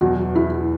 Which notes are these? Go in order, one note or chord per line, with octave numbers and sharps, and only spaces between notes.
E2 B2 F#3 F#4
E4